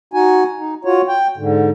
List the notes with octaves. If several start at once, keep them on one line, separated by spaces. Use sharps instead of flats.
D#4 F#4 G#5
D#4
F4 F#4 C#5
G5
G#2 D3